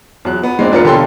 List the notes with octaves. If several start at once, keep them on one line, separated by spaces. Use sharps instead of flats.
E2 F#3 F#6
B3
G#3 A#3 C4 D4
E2 D4 F4 A#4 B4 C#7
E1 D3 F4 G4 A4 C6